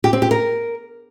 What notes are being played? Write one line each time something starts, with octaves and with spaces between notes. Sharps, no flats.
G4
C4
G4
A#4